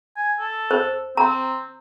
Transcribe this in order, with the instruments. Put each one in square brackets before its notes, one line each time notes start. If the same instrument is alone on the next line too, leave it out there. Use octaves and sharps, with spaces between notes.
[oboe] G#5
A4
[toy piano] C5
[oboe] C4 [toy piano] A#5